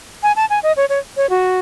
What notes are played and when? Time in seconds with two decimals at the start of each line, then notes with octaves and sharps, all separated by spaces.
0.23 G#5
0.36 A5
0.50 G#5
0.63 D#5
0.77 C#5
0.89 C#5
1.17 C#5
1.30 F#4